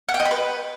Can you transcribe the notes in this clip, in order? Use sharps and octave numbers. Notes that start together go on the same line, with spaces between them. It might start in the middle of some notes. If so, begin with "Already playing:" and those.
F#5
G5
D#5
B5
B4